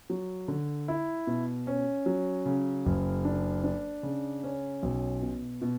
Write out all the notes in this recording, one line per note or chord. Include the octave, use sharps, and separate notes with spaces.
F#3
D3
E4
B2
C#4
F#3
C#3
F#1
D4
D4
C#3
C#4
B1
B2
B2